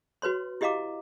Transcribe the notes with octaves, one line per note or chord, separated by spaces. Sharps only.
F#4 B4 C#5 C6
E4 G4 D#5 F5 A#5 D6